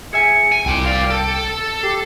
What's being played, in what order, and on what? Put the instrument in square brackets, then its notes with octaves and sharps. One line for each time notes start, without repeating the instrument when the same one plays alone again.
[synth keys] G#4 E5 G#5 [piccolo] C#7
[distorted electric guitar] G#5
[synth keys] C2 D6 [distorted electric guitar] F4 G#5 [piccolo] G5
[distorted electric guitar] D5 F5
A4
[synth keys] G4 [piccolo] C7